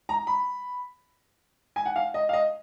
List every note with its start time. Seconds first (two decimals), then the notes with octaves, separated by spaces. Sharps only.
0.09 A#5
0.27 B5
1.76 G#5
1.86 F#5
1.96 F5
2.14 D#5
2.29 F5
2.33 D#5